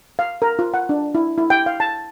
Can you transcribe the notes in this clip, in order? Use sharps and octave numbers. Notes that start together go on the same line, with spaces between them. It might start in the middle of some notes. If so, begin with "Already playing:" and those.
F5
A#4
F4
F#5
D4
E4
E4
G5
F5
A5